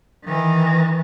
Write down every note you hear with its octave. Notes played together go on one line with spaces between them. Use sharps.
D#3 E3